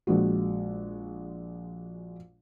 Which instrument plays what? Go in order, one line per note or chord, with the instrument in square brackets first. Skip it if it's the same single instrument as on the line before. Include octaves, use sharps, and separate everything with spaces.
[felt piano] A#1 G#3 F#4